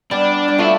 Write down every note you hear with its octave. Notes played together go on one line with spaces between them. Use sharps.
G3 B3 D4
G3
F3 A3 E4